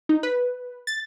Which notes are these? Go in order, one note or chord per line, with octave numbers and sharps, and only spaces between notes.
D#4
B4
A6